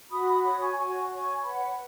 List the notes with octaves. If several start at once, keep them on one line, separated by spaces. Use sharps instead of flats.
F#4 B5 D#6
B5 D#6
C#5 B5 D#6
G#5 C#6
F#4 G#5 C#6
C#5 G#5 C#6
B4 F#5 B5